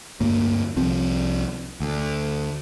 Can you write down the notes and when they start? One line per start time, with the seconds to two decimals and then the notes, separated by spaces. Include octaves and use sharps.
0.20 D2 G2 A#3
0.76 C2 F3 C4
1.81 D2